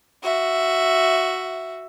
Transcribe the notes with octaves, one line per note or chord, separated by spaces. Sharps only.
F#4 E5